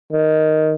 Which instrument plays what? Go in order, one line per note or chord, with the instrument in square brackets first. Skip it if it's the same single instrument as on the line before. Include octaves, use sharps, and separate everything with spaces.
[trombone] D#3